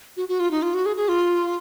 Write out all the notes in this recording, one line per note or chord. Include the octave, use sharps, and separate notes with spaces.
F#4
F#4
F4
D#4
F4
F#4
G#4
G#4
F4